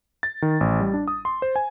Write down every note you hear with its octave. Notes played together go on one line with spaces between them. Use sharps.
A6
D#3
A1
G3
D4
D#6
C6
C5
G#5